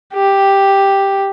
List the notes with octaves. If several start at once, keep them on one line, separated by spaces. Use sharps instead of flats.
G4